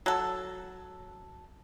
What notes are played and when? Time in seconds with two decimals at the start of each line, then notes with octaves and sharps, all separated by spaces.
0.06 F#3 A4